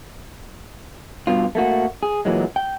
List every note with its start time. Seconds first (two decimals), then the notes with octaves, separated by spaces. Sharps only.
1.27 G2 B2 F4
1.55 A3 A#3 F#4
2.03 G#4
2.25 A#2 E3 F#3 G#3
2.56 G5